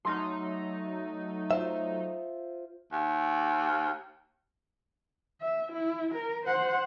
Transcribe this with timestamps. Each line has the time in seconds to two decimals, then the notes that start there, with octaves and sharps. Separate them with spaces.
0.05 F#3 A3 D#4 C6 F6
1.51 F4 C5 E5
2.92 D#2
5.41 E5
5.72 E4
6.15 A#4
6.46 C5 F#5